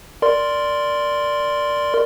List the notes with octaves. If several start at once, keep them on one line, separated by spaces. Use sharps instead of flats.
A#4 D5 C6